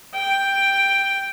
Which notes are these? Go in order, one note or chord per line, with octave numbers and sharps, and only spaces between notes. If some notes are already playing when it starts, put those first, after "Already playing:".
G5